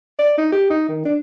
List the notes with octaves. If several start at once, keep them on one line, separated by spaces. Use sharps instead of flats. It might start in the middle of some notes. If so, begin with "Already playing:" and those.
D5
D#4
G4
D#4
D#3
D4